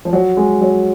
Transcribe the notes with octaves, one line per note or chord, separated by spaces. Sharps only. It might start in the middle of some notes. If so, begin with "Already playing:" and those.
F3
F#3
G#3
F#3